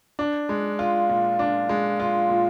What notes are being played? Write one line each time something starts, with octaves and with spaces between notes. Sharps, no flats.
D4
G#3
F4
A#2
D4
G#3
F4
A#2